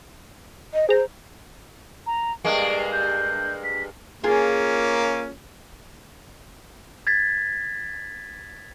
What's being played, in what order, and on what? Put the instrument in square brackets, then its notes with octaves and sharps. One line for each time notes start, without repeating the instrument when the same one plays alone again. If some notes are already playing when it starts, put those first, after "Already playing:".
[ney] D#5
[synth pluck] G#4 A#5 [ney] C5
[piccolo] A#5
[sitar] G2 G#3 A#3 [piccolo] D7
[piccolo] G6
B6
[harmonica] A#3 C#4 [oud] F4 G#4 A#4
[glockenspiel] G#6 A6 B6